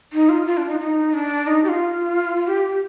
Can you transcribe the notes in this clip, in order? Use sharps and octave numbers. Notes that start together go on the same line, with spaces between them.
D#4
F4
F4
D4
D#4
D#4
D4
D#4
G4
F4
G4